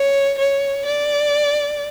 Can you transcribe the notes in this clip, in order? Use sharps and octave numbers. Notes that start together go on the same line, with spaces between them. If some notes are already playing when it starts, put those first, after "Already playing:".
Already playing: C#5
C#5
D5